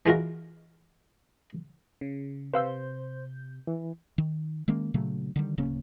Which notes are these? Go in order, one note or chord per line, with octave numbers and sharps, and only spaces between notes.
E3 G#3 F4 F#4 A#4
C#3
C3 B4 C5 F5 E6 G6
E3
D#3
D#3 G#3 A#3 C#4
A#2 C#3 F#3 A3
D3 D#3 G3
D1 C#3 A#3 C#4